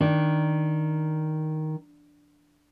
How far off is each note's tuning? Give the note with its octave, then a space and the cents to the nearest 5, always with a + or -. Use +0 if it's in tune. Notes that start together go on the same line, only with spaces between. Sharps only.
D#3 +0 D4 +0